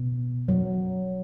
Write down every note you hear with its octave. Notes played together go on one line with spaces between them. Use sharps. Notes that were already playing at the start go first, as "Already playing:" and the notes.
Already playing: B2
F#3